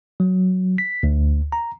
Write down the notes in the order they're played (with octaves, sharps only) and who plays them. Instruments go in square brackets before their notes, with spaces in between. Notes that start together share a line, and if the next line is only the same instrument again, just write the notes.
[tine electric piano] F#3
B6
D2
A#5